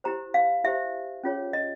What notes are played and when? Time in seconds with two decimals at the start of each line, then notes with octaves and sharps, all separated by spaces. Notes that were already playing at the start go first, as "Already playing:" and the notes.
0.04 E4 G4 C5 A#5
0.34 F5
0.64 E4 G4 C5 E5
1.24 C#4 F4 G#4 C#5
1.53 D#5